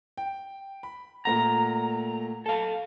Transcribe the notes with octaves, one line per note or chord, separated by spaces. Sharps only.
G5
B5
A#2 A3 F#5 A#5
A4 F5